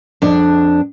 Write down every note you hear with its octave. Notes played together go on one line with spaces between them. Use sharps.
F2 D4